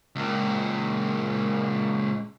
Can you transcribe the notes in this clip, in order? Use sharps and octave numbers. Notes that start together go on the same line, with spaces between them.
C#2 A#2